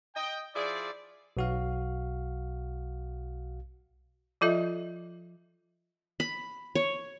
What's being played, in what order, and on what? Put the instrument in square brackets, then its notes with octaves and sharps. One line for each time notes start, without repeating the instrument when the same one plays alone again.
[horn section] D#5 G5
F3 E4 G#4 D5
[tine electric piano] B1 F#4 F5
[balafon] F3 F4 A4 D#5 E5
[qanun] B5
C#5